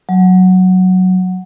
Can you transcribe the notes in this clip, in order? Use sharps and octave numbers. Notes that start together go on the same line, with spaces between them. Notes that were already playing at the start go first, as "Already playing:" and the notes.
F#3